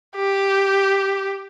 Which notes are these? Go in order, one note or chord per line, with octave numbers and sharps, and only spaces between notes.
G4